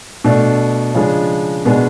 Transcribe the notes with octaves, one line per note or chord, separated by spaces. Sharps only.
B2 A3 D4
C#3 F3 G#3 D4
B2 G#3 B3 D4